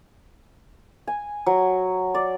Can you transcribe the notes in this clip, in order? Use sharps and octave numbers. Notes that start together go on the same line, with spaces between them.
G#5
F#3
D5